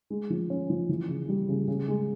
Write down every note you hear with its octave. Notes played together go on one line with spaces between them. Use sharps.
G#3
F3
C#4
F3
E3
C#3
G3
C#3
C#3
G#3